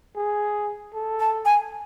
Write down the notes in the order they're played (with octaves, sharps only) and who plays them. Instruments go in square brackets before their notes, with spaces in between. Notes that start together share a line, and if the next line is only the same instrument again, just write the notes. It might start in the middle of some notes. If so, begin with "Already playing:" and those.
[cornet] G#4
A4
[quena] A5
G#5